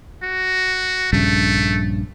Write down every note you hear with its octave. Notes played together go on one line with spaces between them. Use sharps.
F#4
A#1 G2 C#3 A3